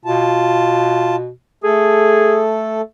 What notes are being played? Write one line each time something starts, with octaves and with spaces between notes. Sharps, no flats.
B2 F4 A5
A3 G#4 A4